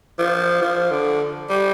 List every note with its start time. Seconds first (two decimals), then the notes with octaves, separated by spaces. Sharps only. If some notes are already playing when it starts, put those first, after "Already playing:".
0.19 F3
0.61 F3
0.91 D3
1.49 G3